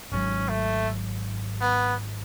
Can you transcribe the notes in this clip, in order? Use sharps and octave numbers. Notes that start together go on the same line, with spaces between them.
G#1 G#2 F#3 C#4
A3
B3